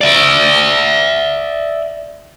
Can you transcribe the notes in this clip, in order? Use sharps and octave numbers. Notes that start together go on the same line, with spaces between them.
D5 E5